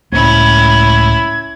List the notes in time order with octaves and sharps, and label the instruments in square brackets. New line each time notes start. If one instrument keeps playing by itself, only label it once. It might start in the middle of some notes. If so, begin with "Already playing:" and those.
[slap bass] C#2 A2 A#3 [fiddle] C#4 E4 [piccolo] G#6